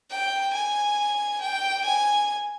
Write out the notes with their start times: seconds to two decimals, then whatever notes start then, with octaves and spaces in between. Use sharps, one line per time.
0.10 G5
0.54 G#5
1.42 G5
1.85 G#5